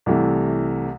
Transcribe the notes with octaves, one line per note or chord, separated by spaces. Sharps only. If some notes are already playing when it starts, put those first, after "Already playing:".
C2 C3 E3 A3